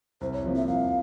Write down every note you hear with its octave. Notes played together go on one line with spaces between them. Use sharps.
C2 C5
C#5
C3 F3 A#3
E5
C2 F5